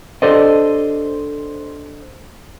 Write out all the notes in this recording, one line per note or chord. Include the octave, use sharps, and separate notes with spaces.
D4 G4 A4 C5 D5 D#5